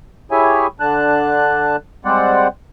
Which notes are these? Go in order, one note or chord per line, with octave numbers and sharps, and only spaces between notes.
E4 G4 G#4 C#5 E5 G#5
D3 D4 A5 F#6
G3 G#3 C4 C5 D5 F#5